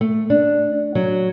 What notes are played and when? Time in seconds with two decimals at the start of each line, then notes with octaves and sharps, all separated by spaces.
0.01 A3
0.30 D4
0.95 F#3